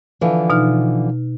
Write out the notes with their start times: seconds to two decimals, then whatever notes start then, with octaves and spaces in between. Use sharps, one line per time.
0.21 D3 E3 F3
0.50 B2 D#4 F6